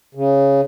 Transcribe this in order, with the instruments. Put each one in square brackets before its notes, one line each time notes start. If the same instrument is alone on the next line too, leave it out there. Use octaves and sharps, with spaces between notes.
[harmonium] C#3